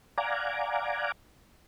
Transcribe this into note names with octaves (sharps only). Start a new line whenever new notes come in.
D5 F5 F#5 G#5 A#5 D6